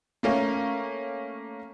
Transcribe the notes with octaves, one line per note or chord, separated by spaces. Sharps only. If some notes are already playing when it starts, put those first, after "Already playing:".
A3 A#3 C#4